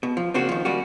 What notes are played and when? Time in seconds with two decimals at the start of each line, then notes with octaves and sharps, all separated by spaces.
0.03 B2
0.17 F3
0.34 C#3 A#3 C4 D4 F#4
0.49 D#3 F3
0.65 G3 A#3 C#4 F#4